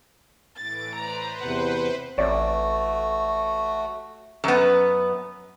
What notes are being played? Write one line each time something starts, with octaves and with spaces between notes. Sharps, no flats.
A2 E3 A6 D7
B4 C5 D5 A#5
E2 C3 F#5
A1 A3 F#4 C#5 D5
F#2 B3